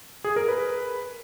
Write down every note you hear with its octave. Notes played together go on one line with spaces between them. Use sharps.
G#4
A#4
B4